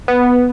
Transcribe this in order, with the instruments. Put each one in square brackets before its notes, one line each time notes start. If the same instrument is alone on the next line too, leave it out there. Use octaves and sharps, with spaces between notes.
[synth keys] B3